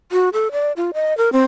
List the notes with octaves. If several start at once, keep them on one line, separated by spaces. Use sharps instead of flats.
F#4
A4
D5
F4
D#5
A#4
C4